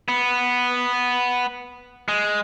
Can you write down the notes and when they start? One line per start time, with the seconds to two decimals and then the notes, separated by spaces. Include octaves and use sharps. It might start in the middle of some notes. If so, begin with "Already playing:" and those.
0.08 B3
2.08 G#3